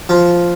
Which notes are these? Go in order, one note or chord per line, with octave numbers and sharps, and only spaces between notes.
F3